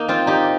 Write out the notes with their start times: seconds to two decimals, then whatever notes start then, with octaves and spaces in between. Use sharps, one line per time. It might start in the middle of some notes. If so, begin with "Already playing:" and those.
Already playing: A#3 D#4
0.09 C4 F4
0.27 D#4 G4